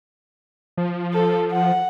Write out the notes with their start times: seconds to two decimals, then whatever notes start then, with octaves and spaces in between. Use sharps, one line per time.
0.77 F3
1.14 A4
1.51 F#5